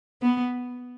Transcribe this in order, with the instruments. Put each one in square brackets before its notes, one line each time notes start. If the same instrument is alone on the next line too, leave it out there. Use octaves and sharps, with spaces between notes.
[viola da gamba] B3